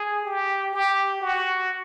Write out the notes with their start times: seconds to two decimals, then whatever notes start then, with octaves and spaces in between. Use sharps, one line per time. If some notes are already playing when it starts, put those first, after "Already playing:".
Already playing: G#4
0.25 G4
0.74 G4
1.21 F#4